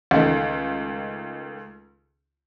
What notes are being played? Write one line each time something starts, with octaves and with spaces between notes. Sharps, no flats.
C#2 D#3 A3